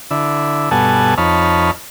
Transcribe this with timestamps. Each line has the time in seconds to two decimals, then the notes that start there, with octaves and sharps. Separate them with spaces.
0.11 D3 E4
0.71 G2 B2 A4 F#5 G#5 A5
1.18 F2 D#4 C#5 A5 B5 F6